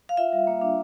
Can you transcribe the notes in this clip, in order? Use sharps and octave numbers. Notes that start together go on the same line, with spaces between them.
F5
F4 E5
G3
A#3
D4